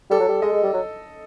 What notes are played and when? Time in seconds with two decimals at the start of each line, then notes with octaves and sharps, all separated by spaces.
0.11 G3 A4
0.20 F#3
0.29 G3
0.42 G#3 D#5
0.53 G#3
0.63 G3
0.73 F#3